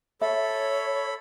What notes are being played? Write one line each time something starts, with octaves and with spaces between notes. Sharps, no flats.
A4 C#5 E5 B5